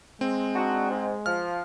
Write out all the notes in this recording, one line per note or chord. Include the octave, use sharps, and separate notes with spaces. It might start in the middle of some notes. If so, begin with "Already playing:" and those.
G#3 C4
D4 D#4 F#4
G#2
F3 F6